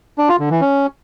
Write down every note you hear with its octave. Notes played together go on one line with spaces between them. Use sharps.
D4
F4
D3
E3
C#4